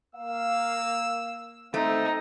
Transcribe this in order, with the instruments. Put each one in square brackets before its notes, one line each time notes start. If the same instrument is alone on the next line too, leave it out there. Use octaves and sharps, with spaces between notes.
[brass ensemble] A#3 F5 [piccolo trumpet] E6
[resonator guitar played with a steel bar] A3 [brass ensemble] C4 [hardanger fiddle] D#4